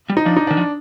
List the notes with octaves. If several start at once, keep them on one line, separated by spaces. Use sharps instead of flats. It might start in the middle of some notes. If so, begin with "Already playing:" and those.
G3
D#4
F3 D4
D#4
D#3 D4
F3